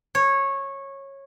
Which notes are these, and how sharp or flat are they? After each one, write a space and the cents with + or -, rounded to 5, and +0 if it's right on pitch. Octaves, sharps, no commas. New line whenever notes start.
C#5 -15